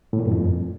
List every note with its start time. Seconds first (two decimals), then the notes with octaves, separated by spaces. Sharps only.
0.13 A2
0.19 A#2
0.25 G2
0.31 F2